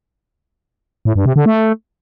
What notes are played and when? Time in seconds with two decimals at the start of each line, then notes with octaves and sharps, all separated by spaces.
1.05 A2
1.16 G2
1.26 C3
1.36 D3
1.46 A3